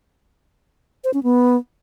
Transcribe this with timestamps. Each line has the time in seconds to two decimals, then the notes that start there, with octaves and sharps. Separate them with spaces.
1.04 C5
1.14 C#4
1.23 B3